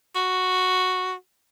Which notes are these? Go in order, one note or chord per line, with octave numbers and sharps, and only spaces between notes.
F#4